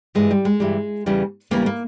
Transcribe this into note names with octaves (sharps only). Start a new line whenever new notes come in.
G2 E3 G3 G#3
G3
G#3
G2 E3 G3
E2 C#3 E3 G3
E2 C#3 E3 G3 A#3
A#3